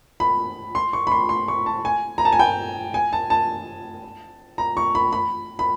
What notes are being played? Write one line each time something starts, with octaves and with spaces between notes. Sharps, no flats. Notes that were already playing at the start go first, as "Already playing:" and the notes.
B5
C6
C#6
B5
C6
C6
C#6
A5
G#5
A#5
A5
G#5
G5
G#5
A5
A5
A#5
C#6
B5
B5
B5